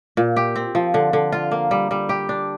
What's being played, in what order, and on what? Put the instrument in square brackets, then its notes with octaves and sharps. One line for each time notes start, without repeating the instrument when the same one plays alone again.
[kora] A#2
G4
C4
F3
D3
D3
F4
A#3
G3
G3
G4
D4